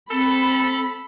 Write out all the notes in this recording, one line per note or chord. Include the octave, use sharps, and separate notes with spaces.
C4 A4 B5